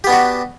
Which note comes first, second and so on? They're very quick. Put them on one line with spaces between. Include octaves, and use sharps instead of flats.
G4 B3 D4 F#4